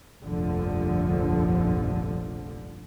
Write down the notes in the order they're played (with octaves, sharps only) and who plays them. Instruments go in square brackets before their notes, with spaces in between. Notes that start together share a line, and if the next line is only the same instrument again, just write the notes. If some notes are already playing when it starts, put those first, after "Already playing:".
[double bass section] F1 A#1 G2 D3 F3